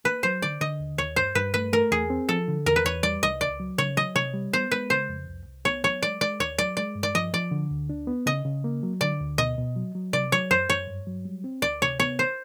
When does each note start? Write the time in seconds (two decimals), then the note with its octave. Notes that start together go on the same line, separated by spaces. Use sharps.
0.04 A#3 B4
0.23 F#3 C5
0.42 D3 D5
0.61 D3 D#5
0.80 D#2
0.98 D#2 C#5
1.16 G2 C5
1.35 G2 B4
1.54 A3 B4
1.73 A3 A#4
1.91 E2 G#4
2.10 C4
2.29 F3 A4
2.48 D3
2.66 E2 A#4
2.76 B4
2.85 E2 C#5
3.03 G3 D5
3.23 C2 D#5
3.41 C#2 D5
3.60 F#3
3.78 C#3 C#5
3.97 F#3 D#5
4.16 C3 C#5
4.34 G3
4.53 B3 C5
4.71 G#3 B4
4.90 C#3 C5
5.09 F2
5.27 C2
5.46 C2
5.65 B3 C#5
5.83 F#3 C#5
6.02 G#3 D5
6.21 G#3 D5
6.40 D#2 C#5
6.58 F#3 D5
6.77 G#3 D5
6.95 G2
7.03 D5
7.15 F3 D#5
7.33 F3 D5
7.51 D3
7.71 D2
7.90 D4
8.07 B3
8.26 C#3 D#5
8.45 C#3
8.64 A#3
8.83 F#3
9.01 D3 D5
9.21 D2
9.38 B2 D#5
9.58 B2
9.76 F#3
9.95 F#3
10.13 C3 D5
10.32 F#3 C#5
10.51 F#2 C5
10.69 F#2 C#5
10.87 G2
11.07 F#3
11.25 G3
11.44 C4
11.62 D2 D5
11.82 C3 C#5
12.00 B3 C#5
12.19 C5